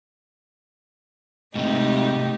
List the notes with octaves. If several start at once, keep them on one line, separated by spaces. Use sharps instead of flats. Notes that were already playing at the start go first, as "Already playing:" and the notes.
G#2 C3 A3 D#4 G4